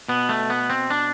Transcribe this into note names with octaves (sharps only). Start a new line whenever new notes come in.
B2 B3
A3
B3
C4
D4